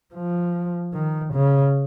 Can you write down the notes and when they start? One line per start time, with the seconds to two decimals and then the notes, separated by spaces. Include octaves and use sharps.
0.15 F3
0.94 D#3
1.34 C#3